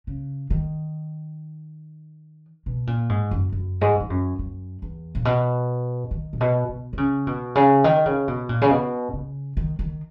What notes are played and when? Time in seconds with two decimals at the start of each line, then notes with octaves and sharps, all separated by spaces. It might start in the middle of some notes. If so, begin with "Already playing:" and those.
0.07 C#3
0.50 D#3
2.66 B2
2.87 A#2
3.09 G#2
3.31 F#2
3.52 F#2
3.81 G#2
4.00 G#2
4.10 F#2
4.39 F#2
4.82 E2
5.15 A#2
5.25 B2
6.11 D#3
6.33 A#2
6.41 B2
6.69 B2
6.93 D#3
6.98 C#3
7.27 B2
7.55 C#3
7.84 D#3
8.06 C#3
8.28 B2
8.49 A#2
8.62 C#3
8.71 B2
9.13 C#3
9.57 D#3
9.79 D#3